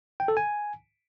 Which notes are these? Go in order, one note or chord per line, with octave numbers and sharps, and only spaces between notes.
G5
A4
G#5